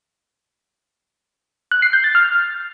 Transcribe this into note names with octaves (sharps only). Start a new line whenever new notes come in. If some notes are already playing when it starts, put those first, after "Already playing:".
F#6
C7
G6
A6
F6